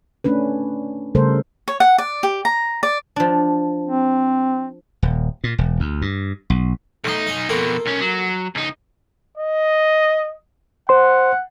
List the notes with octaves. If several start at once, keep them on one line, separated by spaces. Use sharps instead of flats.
A3 C#4 D4 B4
C#3 G3 A3 A4 A#4 C5
C#5
F#5
D5
G4
A#5
D5
F3 D4
C4
D#1
A#2
E1
D2
G2
B1
B1 A3 D#4 F5
F5 G#5
F2 B2 A#3 F4 A4
B1 C#4
F#3
C#2 D#4
D#5
C5 F#5 C6